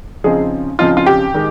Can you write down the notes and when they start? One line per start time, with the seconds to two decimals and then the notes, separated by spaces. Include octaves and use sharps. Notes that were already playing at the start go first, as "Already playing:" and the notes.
0.24 C#3 F3 C4 D#4 G#4
0.79 C#3 F3 C4 D#4 F4
0.97 F4
1.06 G4
1.34 D#3 G#3